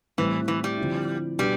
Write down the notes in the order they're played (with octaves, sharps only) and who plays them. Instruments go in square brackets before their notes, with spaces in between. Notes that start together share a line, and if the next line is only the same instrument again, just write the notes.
[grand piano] A2 G3 C4 [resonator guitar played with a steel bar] E3
[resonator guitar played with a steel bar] E3
G3
[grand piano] D3 F3 C4 E4
[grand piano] B2 B3 D4 [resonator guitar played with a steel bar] G3